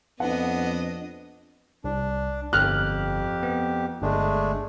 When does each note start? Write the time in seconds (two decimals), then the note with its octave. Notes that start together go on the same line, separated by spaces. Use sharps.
0.20 F2 B3 D4 D#5 F#5
1.84 C2 D4
2.53 G1 F2 G4 F6 F#6
3.43 B3
4.02 G1 G#3 A3 D4